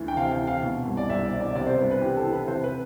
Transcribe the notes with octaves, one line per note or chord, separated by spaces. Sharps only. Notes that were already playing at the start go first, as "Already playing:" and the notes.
Already playing: D2 E3
G5
C3 F5
G5
E3
F5
B2
C2
D5
C2 E5
D5
B2
D5
C3 D5
C5
C2 B4
B4
E3 G4
A4
E3
B4
C3 C5
B4